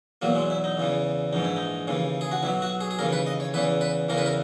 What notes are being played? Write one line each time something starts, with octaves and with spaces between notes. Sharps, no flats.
E2 B2 F#3 A#3
G#3
E4
D#4
E2 C#3 E3
A#1 G#2 E3 D#4
E4
D#4
D#2 C#3 E3
G#4
F#4
B1 B2 F#3 E4
F#4
G#4
G#4
D#2 C#3 E3 A#4
B4
D#5
C#5
E2 C#3 E3 B4
B4
E2 C#3 E3 A#4
B4
A#4